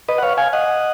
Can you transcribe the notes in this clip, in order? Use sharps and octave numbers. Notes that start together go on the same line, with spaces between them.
B4 D#5
F#5
C#5 F5
F5 G#5
D#5 F#5